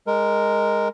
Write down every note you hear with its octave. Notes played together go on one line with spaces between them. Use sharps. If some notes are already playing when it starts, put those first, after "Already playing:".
G#3 A#4